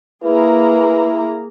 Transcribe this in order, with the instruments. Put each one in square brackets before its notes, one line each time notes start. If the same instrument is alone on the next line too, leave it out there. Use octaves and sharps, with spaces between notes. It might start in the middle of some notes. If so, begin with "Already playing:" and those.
[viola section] A#3 G#4 A#5 [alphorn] E4 [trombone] B4